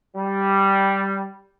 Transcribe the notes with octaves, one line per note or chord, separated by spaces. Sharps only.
G3